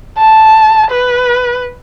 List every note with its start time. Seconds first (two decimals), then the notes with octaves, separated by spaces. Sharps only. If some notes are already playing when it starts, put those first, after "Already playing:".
0.18 A5
0.91 B4